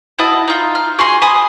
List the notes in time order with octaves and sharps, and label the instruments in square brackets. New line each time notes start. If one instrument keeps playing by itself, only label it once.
[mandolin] E4 F#4 D#5 A5
D#4 F4
F6
F#4 G#4 G#5 C6
G#5 B5 D#6